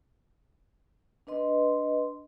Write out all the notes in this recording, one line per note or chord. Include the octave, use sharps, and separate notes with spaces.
D4 B4 D#5 C6